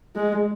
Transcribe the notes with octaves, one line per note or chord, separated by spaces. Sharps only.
G#3